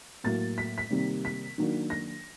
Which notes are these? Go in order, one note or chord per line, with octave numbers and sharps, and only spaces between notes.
A2 F#3 A#3 A6
B6
B6
C3 D#3 G3 A#3
B6
D#3 F#3 A#3 D4
A#6